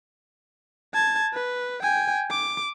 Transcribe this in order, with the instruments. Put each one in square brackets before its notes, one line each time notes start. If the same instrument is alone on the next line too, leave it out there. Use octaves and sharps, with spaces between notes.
[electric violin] A5 G#6
B4
G5 G#5
D6